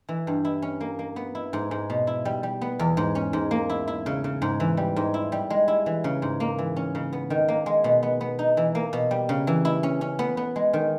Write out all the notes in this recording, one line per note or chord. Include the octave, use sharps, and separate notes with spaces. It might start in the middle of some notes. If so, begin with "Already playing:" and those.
E3
G2
E4
C#4
A#3
A#3
B3
E4
G#2
G#2
B2
E4
G3
G3
B3
E2
G#2
C#4
G#2
A#3
E4
E4
C#3
C#3
G#2
E3
G3
G#2
E4
G3
G#3
E4
E3
C#3
G#2
A#3
E3
C#4
C#3
B3
D#3
A#3
G#3
B2
B3
B3
D#4
E3
A#3
B2
G3
C#3
E3
E4
C#4
C#4
B3
B3
G#3
D#3